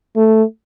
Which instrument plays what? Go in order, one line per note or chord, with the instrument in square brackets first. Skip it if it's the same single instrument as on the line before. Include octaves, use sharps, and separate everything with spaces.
[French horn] A3